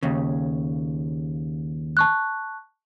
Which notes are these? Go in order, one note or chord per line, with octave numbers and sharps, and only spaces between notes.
D#2 C#3
A5 C#6 F#6